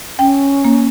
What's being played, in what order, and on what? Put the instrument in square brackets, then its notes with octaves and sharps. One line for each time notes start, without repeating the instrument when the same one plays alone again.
[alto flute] C#4 [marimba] G5
[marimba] A#3